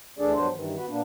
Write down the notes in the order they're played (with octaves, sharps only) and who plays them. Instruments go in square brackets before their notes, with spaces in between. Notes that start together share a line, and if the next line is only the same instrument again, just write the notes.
[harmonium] D2 E3 D4 G#4 A4 D5
G2 F#3 B3 D4 C5
G2 D#3 E3
B3 F#4 B4
A#2 A#3 B3 D4